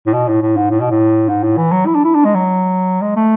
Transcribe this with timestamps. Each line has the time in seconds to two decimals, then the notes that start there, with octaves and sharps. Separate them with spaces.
0.07 A2
0.13 B2
0.28 A2
0.42 A2
0.57 G#2
0.71 A2
0.80 B2
0.90 A2
1.29 G#2
1.43 A2
1.57 E3
1.72 F#3
1.87 E4
1.95 D4
2.04 E4
2.15 D4
2.25 G#3
2.35 F#3
3.02 G#3
3.16 A3